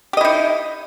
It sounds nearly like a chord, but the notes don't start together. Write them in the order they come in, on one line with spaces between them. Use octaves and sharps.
G4 D#5 E4 D#4